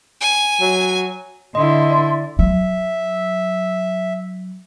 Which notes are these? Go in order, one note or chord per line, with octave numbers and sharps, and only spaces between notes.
G#5
F#3
D3 E4 D#5 C6
D5
F#3 E5